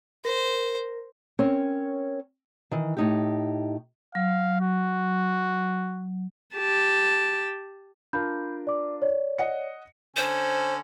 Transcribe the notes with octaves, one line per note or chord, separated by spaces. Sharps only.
A#4 C5
C4 C#4 A#4 C#5
D#3 E3
A2 D#4 G4
F#3 F5
F#4
G4 A5
D4 F4 A#4 B5 G6
D5 D6
C#5 D5
D#5 F#5 C#7
D3 C#4 C5